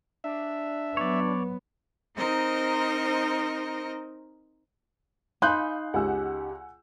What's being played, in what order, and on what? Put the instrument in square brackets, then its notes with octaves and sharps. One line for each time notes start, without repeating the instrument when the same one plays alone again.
[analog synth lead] D4 [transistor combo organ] E5
[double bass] F#3 B3 [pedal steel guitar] C#5 D5
[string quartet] C4 D#4 A#4 C5 D#5
[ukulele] D#4 B5 [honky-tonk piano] F5 G#5 [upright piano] C6 F#6 G6
[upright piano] C#2 [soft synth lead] G4 [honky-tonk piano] F#5 G#5 E6